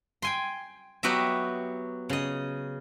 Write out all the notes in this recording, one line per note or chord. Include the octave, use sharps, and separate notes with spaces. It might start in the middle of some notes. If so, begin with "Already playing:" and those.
G5 G#5 C6
F#3 B3 F#4 G4 D#5 E5
C#3 D#5